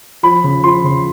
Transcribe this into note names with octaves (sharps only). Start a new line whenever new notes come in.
F3 B5
C#3
F3 C6
C#3